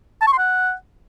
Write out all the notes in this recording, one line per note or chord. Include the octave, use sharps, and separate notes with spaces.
A5
C#6
C6
F#5